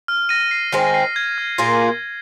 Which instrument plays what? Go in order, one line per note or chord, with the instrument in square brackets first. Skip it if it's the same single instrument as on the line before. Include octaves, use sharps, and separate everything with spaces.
[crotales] F6
A#6 D#7
C7
[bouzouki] D#3 G#3 C4 G#4
[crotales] A#6
C7
G#6
F6
[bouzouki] A#2 A#3 F4 G#4